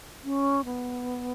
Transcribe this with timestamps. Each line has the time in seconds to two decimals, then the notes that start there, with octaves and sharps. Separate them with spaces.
0.24 C#4
0.65 B3